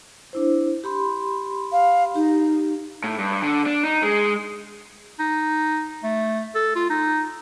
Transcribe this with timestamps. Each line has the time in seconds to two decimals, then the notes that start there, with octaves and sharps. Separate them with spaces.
0.33 D4 E4 C5
0.84 G4 B5 C6
1.72 F5
2.15 D#4 G4
3.04 A2
3.18 G2
3.43 D3
3.66 D4
3.85 D#4
4.03 G#3
5.19 D#4
6.03 A3
6.55 A4
6.76 F4
6.90 D#4